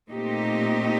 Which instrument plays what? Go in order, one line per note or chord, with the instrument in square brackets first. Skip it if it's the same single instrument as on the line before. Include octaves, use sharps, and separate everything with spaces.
[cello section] A#2 A3 C4 D#4 G4